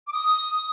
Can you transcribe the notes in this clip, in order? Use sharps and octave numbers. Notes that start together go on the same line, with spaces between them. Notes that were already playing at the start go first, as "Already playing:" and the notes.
D6
D#6